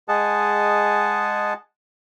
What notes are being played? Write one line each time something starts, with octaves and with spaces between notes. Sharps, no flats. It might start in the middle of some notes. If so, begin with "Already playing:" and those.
G#3 G#4 D#5 F#5 A5